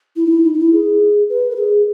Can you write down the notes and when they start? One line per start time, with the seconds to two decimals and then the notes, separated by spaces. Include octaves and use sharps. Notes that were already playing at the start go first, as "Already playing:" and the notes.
0.16 E4
0.26 D#4
0.30 E4
0.44 D#4
0.54 D#4
0.59 E4
0.73 G#4
1.29 B4
1.51 A#4
1.56 G#4